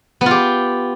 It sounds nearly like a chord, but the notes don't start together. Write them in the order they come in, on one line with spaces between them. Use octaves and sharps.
B3 F4 G4